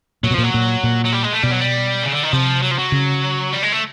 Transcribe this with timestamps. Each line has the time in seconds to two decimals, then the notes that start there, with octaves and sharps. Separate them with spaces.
0.23 A#2 F#3
0.31 B2
0.34 A#2 F3
0.44 F#3
0.54 A#2
0.84 A#2
1.05 F#3
1.13 G3
1.24 G#3
1.33 A3
1.43 B2 G3
1.51 F#3
1.60 G3
2.03 C#3
2.13 D3
2.24 D#3
2.33 C3 F3
2.62 F#3
2.71 F3
2.78 F#3
2.92 C#3
3.52 G3
3.63 G#3
3.72 A3